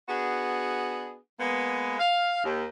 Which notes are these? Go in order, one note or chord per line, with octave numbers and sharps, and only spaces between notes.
B3 D4 F#4 G#4
G#3 A#3 B3
F5
D#2